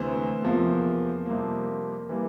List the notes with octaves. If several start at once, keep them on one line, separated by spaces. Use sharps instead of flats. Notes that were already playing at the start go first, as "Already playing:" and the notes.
Already playing: D2 C3 E3 C5
E2 C3 F3 A#3
F2 C3 G3 A#3
E3 G3 A#3